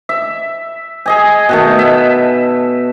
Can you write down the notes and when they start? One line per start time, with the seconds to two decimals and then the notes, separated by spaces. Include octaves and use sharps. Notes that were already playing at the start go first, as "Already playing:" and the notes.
0.09 E5
1.06 G#4 D#5 G#5
1.49 B2 D#3 A3
1.79 E5